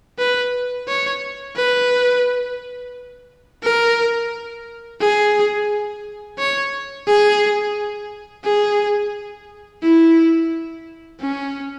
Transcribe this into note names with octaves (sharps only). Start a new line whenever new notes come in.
B4
C#5
B4
A#4
G#4
C#5
G#4
G#4
E4
C#4